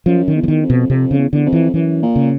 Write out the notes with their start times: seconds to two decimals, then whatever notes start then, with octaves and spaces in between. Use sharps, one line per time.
0.06 F#2 F3
0.28 D#3
0.35 E2
0.43 E3
0.48 D#3
0.62 F2
0.70 B2
0.90 F2 C3
1.11 C#3
1.18 E2
1.33 E2 D3
1.46 F2
1.53 E3
1.74 F#2 E3
2.02 A#2
2.16 C#3